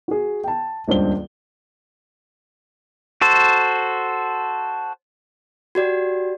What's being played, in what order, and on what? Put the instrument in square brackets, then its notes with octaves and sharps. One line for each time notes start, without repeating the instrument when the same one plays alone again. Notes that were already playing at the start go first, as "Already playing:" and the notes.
[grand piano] F#4 G#4
G5 A5
D#1 C#2 G2 C5 G7
[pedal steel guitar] F#4 A4 C5
[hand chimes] F#4 G4 D5